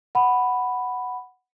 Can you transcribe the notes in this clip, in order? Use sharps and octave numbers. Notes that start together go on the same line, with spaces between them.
F#5 B5